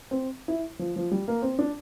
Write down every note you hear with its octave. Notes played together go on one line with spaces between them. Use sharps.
C4
E4
F3
F3
G3
A#3
C4
D4